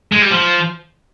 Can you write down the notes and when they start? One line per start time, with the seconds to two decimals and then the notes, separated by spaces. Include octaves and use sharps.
0.12 G#3
0.22 G3
0.31 F3